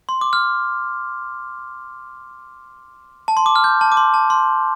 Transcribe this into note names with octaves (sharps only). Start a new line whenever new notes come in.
C6
D6
F6
A5
C6
D6
F6
G6
A5
D6
C6
A5
C6